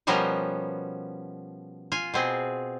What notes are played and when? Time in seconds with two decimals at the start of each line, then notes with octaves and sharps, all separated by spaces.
0.07 B2 F3 G3 B3 C#4 A#4
1.92 F4 G#5
2.14 B2 C4 G#4